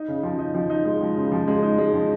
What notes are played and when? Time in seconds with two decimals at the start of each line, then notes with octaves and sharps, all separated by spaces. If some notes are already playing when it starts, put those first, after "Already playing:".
Already playing: D#4
0.08 C#3
0.23 F3
0.39 D#4
0.55 F3
0.70 D#4
0.85 G#3
1.01 F3
1.17 C#3
1.32 F3
1.48 G#3
1.63 D#4
1.78 G#3
1.94 F3